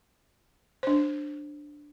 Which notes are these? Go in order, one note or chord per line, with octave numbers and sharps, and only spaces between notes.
D4 C5